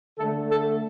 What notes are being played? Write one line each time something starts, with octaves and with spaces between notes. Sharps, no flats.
D3 A3 A4
A4